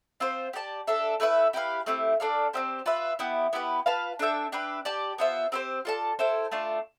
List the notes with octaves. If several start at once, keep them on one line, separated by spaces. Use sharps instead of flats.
C4 F4 C5
G4 D5 A5
D4 A4 E5
A3 E4 B4 E5
E4 G4 B4 F5
A3 C4 E4 G4
D4 A4 D5 F5
C4 E4 G4 C5
F4 B4 E5
B3 E4 G4
B3 E4 G4 B4
F4 B4 F5 A5
D4 A4 E5 G5
D4 G4 B4 E5
G4 D5 A5
B3 F4 C5 E5
C4 G4 C5
F4 A4 D5 A5
E4 A4 C5 G5
A3 D4 F4